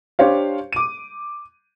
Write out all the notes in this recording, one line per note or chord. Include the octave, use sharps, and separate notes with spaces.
D4 G4 C5 C#5 F5
D6 D#7